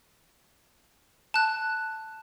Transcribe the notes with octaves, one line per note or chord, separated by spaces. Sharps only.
A5 F#6